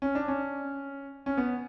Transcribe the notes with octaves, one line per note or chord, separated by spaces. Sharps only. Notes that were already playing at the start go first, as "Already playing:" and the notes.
C#4
D4
C#4
C#4
B3